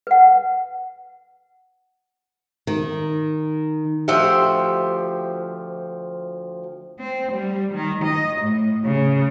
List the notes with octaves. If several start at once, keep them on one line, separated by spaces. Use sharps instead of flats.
B4 F#5
D#3
D2 F3 G4 C5 E5 F#5
C4
G3
D#3
D#5
A2
C#3